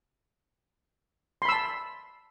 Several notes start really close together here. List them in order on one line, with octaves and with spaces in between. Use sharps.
C6 B5 E6 A5